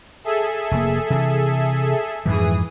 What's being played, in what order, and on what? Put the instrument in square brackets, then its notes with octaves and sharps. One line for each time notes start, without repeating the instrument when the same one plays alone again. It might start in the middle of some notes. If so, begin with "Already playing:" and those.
[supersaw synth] G#4 A4 E5
[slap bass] F1 A#3
C3 E3
[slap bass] F2 G#2 F3 [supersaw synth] E3 G#4 D#6